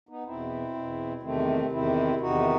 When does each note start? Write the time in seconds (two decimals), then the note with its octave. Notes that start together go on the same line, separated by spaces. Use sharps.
0.09 B3 D#4
0.25 E2 B2 C4 E4
0.74 E2 B2
1.22 E2 C3 D#3 A3 C4
1.71 E2 C3 D#3 C4 E4
2.20 E2 C3 D#3 D#4 F#4